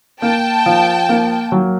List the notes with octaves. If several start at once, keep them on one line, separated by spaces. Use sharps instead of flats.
A#3 G5 A5
F3
A#3
F#3